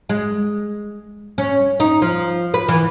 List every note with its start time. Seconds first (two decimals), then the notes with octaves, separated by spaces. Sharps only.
0.09 G#3
1.38 C#4
1.80 D#4
2.02 F3
2.54 B4
2.69 E3